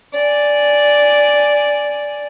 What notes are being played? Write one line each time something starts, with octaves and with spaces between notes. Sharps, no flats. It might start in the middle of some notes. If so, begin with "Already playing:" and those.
D5 G#5